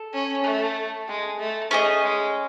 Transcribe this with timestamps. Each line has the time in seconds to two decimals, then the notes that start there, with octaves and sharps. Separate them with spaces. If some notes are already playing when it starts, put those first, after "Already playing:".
Already playing: A4
0.13 C#4
0.44 A3
1.08 G#3
1.40 A3
1.71 A3 C#4 G#4 D#5
2.03 G#3